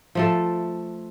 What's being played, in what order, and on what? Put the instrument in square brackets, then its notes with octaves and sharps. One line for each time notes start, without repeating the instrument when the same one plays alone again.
[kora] F3 A3 A4